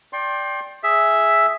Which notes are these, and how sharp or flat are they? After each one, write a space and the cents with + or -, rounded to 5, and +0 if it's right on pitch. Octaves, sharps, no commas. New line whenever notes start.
D5 +0 G5 +0 C6 +30
G#4 +0 E5 +0